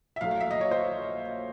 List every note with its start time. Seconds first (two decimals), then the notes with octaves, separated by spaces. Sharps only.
0.16 E5
0.21 A#1 A#2 F#3 A3 F5
0.31 F5
0.40 E5
0.51 D#5
0.61 C#5
0.71 C5